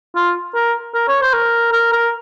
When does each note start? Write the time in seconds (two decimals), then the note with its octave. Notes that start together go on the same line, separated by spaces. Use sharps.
0.16 F4
0.55 A#4
0.95 A#4
1.08 C#5
1.21 C5
1.33 A#4
1.73 A#4
1.93 A#4